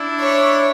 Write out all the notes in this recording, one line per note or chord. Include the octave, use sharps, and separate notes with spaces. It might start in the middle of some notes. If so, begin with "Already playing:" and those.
Already playing: D4 E4
C#5